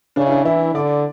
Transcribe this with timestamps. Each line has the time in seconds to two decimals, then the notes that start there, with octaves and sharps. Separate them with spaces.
0.16 C#3 D4
0.26 E4
0.31 D4
0.45 E3 E4
0.74 D3 D5